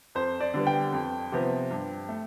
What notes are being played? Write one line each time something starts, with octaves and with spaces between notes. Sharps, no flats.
F2 C5
D5
D3 G3 B3
G5
F2
C3 F3 B3
G2
A3